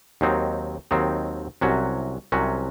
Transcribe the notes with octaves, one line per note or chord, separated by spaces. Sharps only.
D#2 D#3 F#3 C4 D#4
D#2 D#3 F#3 C4 D#4
C2 C3 F#3 C#4 F#4
C2 C3 F#3 C#4 F#4